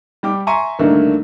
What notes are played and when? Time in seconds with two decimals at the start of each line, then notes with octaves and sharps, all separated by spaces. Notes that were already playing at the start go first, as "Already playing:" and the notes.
0.23 G3 G4 D6
0.47 E5 G#5 A#5 C6 C#6 D#7
0.79 C2 D3 D#3 A3 A#3